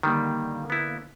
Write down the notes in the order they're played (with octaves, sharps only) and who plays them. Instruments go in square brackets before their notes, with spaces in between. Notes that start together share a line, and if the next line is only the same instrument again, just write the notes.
[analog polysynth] D3 A#3 [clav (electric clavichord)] D#3 G3
[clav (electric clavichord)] B3 E4